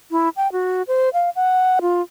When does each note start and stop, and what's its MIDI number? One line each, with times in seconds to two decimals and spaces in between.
0.11 0.29 64
0.37 0.51 79
0.52 0.82 66
0.88 1.09 72
1.14 1.30 77
1.36 1.79 78
1.82 2.02 65